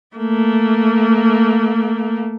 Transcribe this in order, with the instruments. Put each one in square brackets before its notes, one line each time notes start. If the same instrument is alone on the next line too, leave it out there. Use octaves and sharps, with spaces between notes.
[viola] A3 A#3